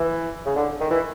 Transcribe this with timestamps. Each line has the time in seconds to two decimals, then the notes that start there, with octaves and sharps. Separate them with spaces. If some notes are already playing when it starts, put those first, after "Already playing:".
Already playing: E3
0.45 C#3
0.56 D3
0.80 D#3
0.91 E3